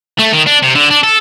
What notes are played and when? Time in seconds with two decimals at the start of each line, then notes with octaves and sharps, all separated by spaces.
0.19 A3
0.33 D#3
0.47 D4
0.63 C3
0.76 D3
0.91 D4
1.03 A4